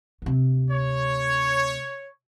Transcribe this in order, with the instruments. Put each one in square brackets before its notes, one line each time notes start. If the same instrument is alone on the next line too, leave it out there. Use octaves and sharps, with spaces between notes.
[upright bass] D2 C3
[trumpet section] C#5